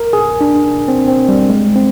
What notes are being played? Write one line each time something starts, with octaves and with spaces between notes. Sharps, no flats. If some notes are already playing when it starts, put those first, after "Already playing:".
Already playing: A#4
G#4
D4
C4
C4
G3
G#3
C4